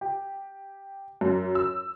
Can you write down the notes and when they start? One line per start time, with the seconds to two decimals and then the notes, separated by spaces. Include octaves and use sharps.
0.01 G4
1.21 F#2
1.55 E6